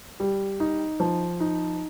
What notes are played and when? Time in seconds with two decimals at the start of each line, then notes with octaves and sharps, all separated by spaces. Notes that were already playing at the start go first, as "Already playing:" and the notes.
0.20 G3
0.60 D#4
1.00 F3
1.40 D#4